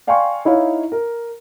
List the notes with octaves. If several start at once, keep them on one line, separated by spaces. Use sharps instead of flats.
D5 F5 G5 G#5 C6 C#6
D#4 E4 C#5 F5
A#4